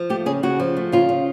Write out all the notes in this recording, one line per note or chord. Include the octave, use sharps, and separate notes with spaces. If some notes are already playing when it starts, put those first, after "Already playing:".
Already playing: F3
A3 G4
C#3 G#4
C#3 F#4
F3
A3
C#3 F4
C#3